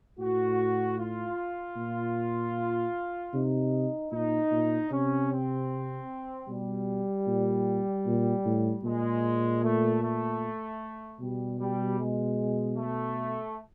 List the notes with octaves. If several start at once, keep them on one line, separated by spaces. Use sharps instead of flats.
A2 F#4
F4
A#2
C3 D#4
A#2 D#4
A#2
C3 C#4
C4
B2 G3
A#2
A#2
A2
A#2 G#3
A3
A3
B2 G3
G3
G#3
A3